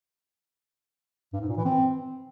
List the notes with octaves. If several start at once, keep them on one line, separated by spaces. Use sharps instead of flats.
G2
G#2
A#2
E3
C4